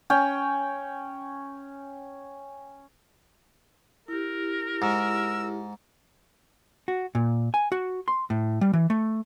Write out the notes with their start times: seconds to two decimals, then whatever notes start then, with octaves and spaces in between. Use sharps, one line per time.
0.10 C#4 G5
4.08 E4 G4 A#4
4.82 G#2 E6
6.88 F#4
7.15 A#2
7.54 G#5
7.72 F#4
8.08 C6
8.30 A2
8.61 G3
8.73 E3
8.90 A3